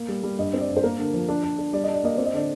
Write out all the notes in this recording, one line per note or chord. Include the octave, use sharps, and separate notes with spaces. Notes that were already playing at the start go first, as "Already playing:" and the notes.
Already playing: A#3
G3
G3
G2 D#5
C4
D5
G2
C5
A#3 A#4
D3
F3
D4
D4
D4
G3 D5
D4 D#5
D5
A#3 D#5
C4 D5
D#5
D3 D5